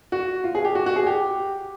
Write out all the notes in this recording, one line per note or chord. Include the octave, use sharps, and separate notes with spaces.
F#4
F4
G#4
G4
F#4
F#4
G#4
G4